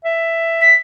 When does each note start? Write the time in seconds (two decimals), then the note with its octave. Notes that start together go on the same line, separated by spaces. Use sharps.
0.05 E5
0.61 B6